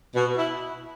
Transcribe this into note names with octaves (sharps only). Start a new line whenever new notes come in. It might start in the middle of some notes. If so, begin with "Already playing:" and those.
B2
E4